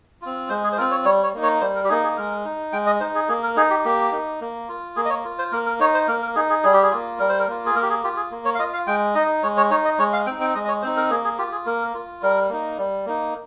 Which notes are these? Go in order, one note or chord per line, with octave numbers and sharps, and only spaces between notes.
C4 F4
G#3 C5
G#4
C5
C4 F4 A#4
C#5
G3 C#5
C#5
A#3 D#4
C#5
G3 C5
A#4
G4
A#3 D#4 G#4
G#4
G#3 A#4
D#4
G#3 G5
D#5
D#4 C5
G#4
A#3 G#4
A#4
D#4 G#4
G4
A#3 G4
D#4
A#3
F4
A#3 G#4
D#5
C#5
F4
C5
A#3 A#4
A#4
D#4 C#5
C5
A#3 A#4
A#4
D#4 G#4
G#4
G3 G#4
G4
G#4
A#3 F4
G3 A#4
C5
A#4
A#3 F4
G#4
A#3 A#4
G4
G#4
F4 G4
G#4
A#3
C#5
F5
F4 D#5
F5
G#3 G5
D#4 D#5
G#3 C#5
C#5
D#4 C#5
D#5
G#3 C#5
F5
C4 D#4 G5
G5
G#3 D#5
D#5
C#5
C4 D#4 C5
A#4
A#3 G#4
G#4
F4 G4
G#4
A#3 A#4
F4
G3 A#4
A#3 D#4
G3
A#3 D#4